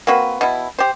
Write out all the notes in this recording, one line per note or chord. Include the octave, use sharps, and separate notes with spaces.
A#3 C4 F#4 B4
B2 E4
G4 C5